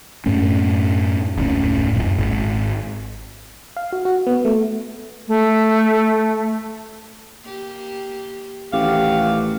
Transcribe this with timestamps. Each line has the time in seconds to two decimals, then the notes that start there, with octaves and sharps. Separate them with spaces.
0.26 F#2 A2 A3 C#4
1.37 F1 D2 A2 C#4
1.93 D1 F#2 A#2
2.18 G#1
3.77 F5
3.93 F#4
4.05 F#4
4.27 B3
4.45 A3
5.28 A3
7.43 A#3 G4
8.73 A1 D#3 A3 F#4 G4 F5